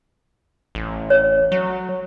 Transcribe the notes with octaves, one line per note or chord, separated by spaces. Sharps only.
A1
C#5
F#3